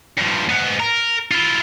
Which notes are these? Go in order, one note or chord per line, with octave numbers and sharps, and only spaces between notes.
G2 F3
G#2 B3
A#4
E4 F4